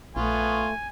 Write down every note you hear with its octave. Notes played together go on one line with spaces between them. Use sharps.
A#1 A3 B3 F4 C#5 G#5